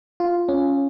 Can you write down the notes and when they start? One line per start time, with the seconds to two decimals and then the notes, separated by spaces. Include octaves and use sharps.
0.20 F4
0.48 C#4